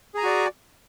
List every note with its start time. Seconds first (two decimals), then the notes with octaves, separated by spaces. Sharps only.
0.15 G#4
0.17 A#5
0.20 G#5
0.23 F#4
0.26 D5